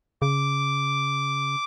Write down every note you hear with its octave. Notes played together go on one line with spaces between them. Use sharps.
C#3 D6